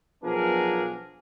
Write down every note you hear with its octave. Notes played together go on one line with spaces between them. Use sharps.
B1 F3 B3 D4 G#4 A#4